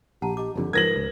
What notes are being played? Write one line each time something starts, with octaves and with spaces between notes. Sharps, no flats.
A#1 G4 F#5 A5 A#5
G4 D#5 D6
F#1 F2 D3 G4
G#2 F3 A#4 B4 G#6 A#6 F#7
C#2